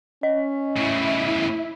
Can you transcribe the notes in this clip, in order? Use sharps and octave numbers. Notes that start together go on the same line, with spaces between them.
C#4 D#5
A2 C#3 E4